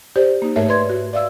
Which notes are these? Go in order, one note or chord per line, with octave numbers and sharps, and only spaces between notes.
G4 C5 D5
A#3 D#4
G#2 A3 A#4 C#5 E5
B4 D5 C6 G#6
F#4
D5 E5 F5 E6